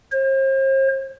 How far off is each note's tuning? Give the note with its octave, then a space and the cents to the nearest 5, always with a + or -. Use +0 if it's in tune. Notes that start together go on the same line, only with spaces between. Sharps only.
C5 +40